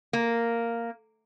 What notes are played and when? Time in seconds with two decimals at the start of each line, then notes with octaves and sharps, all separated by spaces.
0.13 A#3